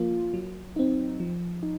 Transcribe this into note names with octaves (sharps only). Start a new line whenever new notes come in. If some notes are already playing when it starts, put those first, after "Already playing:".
Already playing: F3 A#3 F4
F#3
C4 D#4
F3
D#4